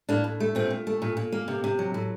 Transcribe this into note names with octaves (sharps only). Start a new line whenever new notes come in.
A2 A#3 D4
A2
A3
A#2 C4
A#2
A3
A#2
A#2
A#3
C3
C3
F#3
A2